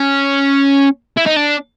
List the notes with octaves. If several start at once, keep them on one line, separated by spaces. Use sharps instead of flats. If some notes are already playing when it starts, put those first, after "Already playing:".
Already playing: C#4
E4
D#4
D4